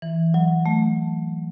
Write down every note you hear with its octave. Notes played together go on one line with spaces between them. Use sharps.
E3
F#3
A3